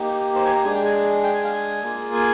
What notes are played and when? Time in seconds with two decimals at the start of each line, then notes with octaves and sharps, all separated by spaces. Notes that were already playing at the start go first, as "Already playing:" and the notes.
Already playing: A#3 D#4 G4
0.36 C5
0.45 G#5
0.55 A#5
0.64 G#3 D4 G#4 G#5
0.75 G5
0.85 G#5
1.24 G5
1.34 G#5
1.44 F5
1.53 G#5
1.83 A#3 F4 G#4
2.14 G#5